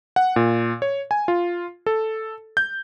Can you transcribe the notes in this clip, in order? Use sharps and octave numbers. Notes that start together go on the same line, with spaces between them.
F#5
A#2
C#5
G#5
F4
A4
G6